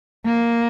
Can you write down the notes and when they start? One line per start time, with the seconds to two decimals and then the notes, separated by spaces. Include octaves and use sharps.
0.26 A#3